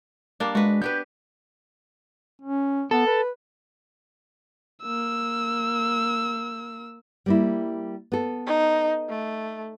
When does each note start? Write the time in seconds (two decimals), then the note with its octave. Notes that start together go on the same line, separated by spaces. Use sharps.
0.40 G3 A#3 D4
0.55 G#3 F#4 B4
0.82 B3 G4 B4 G6
2.41 C#4
2.91 B3 A4
3.07 B4
4.82 A#3 E6
7.26 G3 A#3 E4
8.12 B3 A4
8.47 D#4
9.09 A3